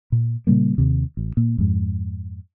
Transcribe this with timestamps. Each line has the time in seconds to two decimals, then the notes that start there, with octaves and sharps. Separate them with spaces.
0.12 A#2
0.47 A#2 C#3 G3 A#3
0.78 D#2 C3
1.17 A1
1.37 A#2
1.58 F2 G#2